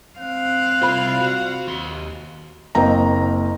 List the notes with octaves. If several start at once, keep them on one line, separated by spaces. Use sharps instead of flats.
C4 F5 F#6
C2 F4 C5 B5
F#4
D#2 C6
F#1 A#3 C4 D#5 G5 A#5